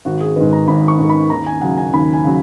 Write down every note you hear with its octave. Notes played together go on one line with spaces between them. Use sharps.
G#1 F#4
G#4
G#2 D#3 B4
A#5
G#1 B5
C#6
G#2 D#3
B5
D#2 A#5
G#5
C#3 F#3 F#5
G#5
D#2 B5
G#5
C#3 F#3